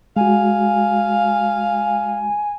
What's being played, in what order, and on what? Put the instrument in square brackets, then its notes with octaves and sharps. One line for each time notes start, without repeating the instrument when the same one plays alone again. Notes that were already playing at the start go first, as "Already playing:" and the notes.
[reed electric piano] G#3 F#4 [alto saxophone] F5 [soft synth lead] G#5